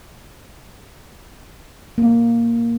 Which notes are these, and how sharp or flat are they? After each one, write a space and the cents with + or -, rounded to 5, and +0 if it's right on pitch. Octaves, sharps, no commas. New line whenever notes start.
A#3 +0